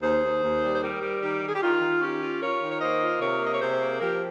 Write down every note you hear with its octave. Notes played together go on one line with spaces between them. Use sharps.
D#2 G#4 C5
D#2
D#2
G3
C5
G3 G4 A#4
G3
D#3 G4
D#3
G#4
G4
D#3 F4
D#3
C#4 G4
F4
F4 A#4 C#5
D#3
C#5
A#3 C5 D#5
F4
C3 A#4 C#5
A#3 D#5
C#5
C3 G#4 C5
A#3
F3 G4 A#4